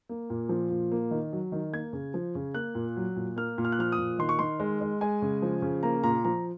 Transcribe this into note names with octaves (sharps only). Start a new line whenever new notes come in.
A#3
A#2
F3
A#2
A#3
D#3
F#3
D#3
A#3 G#6
C#3
F3
C#3
A#3 F#6
A#2
F#3
A#2
A#3 F6
A#2
F6
F#6
F3 F6
D#6
A#2
D#3 C6
C#6
D#3 C6
G#3
G#3
G#3 G#5
C#3
F3
C#3
A#3 A#5
A#2 A#5
F3 A#5